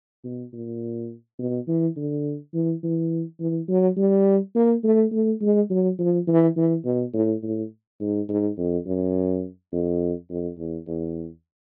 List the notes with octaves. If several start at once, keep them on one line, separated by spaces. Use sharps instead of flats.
B2
A#2
B2
E3
D3
E3
E3
E3
F#3
G3
A#3
A3
A3
G#3
F#3
F3
E3
E3
B2
A2
A2
G#2
G#2
F2
F#2
F2
F2
E2
E2